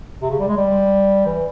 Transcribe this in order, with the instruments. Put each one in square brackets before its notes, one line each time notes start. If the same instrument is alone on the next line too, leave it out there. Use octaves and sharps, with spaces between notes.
[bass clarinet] C3
C#3
G3
G#3
G3
E3